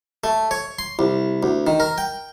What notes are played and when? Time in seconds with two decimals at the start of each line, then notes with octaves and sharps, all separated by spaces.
0.24 A3
0.51 C#5
0.79 C6
0.99 C2
1.43 D2
1.67 D#3
1.80 A#4
1.98 G5